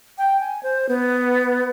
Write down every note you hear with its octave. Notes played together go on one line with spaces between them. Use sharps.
G5
G#5
C5
B3